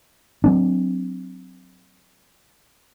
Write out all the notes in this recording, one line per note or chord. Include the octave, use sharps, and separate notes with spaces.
F#3 C4 D4